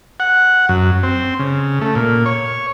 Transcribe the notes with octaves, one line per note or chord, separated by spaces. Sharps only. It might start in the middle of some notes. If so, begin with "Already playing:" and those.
F#5
F#2
C4
C#3
A3
A#2
C#5